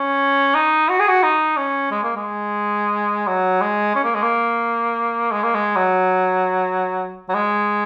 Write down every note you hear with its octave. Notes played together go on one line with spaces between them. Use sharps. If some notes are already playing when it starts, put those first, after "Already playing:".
Already playing: C#4
D#4
F#4
G#4
F#4
D#4
C#4
G#3
A#3
G#3
F#3
G#3
C#4
A#3
G#3
A#3
G#3
A#3
G#3
F#3
F#3
G#3